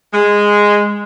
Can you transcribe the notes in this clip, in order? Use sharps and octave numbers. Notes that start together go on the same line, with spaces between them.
G#3